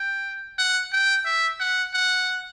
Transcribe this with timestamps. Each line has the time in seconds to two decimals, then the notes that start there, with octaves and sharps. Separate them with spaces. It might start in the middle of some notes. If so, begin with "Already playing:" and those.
Already playing: G5
0.58 F#5
0.92 G5
1.25 E5
1.60 F#5
1.94 F#5